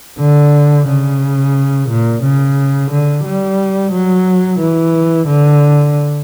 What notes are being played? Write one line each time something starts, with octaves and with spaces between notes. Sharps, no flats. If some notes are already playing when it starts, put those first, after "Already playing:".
D3
C#3
A#2
C#3
D3
G3
F#3
E3
D3